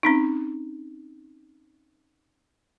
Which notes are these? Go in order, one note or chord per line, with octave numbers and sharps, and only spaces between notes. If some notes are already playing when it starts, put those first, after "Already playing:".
C4 C#4 D#4